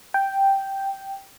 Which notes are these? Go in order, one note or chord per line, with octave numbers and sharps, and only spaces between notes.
G5